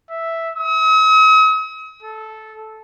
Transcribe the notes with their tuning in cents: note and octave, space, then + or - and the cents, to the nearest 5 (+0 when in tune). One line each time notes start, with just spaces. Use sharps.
E5 +0
D#6 +45
A4 -10